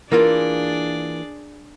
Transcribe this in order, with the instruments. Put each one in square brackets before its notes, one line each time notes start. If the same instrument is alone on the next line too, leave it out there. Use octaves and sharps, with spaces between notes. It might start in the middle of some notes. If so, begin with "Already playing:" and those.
[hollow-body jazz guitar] E3 A#3 F4 [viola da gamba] D4 G#4 D5 [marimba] A#4